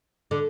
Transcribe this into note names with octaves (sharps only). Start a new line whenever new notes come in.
D3